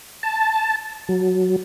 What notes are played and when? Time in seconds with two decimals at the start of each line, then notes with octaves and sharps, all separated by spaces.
0.23 A5
1.09 F#3